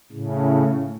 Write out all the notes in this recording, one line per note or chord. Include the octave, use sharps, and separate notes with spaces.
A2 C#3